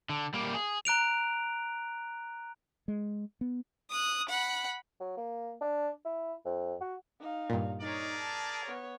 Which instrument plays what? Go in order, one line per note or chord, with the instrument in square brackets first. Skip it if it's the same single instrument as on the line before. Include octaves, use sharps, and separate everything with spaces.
[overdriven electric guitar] D3
G3 A#3
G#4
[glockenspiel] A#5 F#6 D7 F7
[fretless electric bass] G#3
B3
[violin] D#6 F#6
F#5 B5
[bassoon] F#3
A#3
D4
E4
F2
F#4
[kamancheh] D#4 F5
[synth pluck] G2 A#2
[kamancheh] D#4 C#5 [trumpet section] G#4 A#4 D5
[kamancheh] A5
B3 C#5